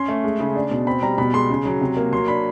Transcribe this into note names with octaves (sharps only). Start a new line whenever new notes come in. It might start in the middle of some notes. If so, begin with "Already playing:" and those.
Already playing: C#4 C6
A3
G#3
C#3
D4
B2
C4 B5
G3 A#5
B2 B5
G#3 C6
C#3
F#3
C3
A#3
F#3 C6
D4 B5